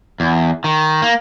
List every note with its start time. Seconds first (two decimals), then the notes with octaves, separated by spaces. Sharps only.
0.20 E2
0.64 D#3
1.02 A#3